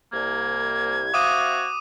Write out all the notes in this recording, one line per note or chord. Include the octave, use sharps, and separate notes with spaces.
C2 A#3 G#6
C4 F#4 E5 F5 D6 D#6 D#7